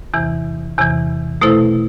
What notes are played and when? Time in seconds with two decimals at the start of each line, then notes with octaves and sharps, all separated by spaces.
0.14 E2 C3 E3
0.78 E2 C3 E3
1.41 B2 A3 E4 A4 C5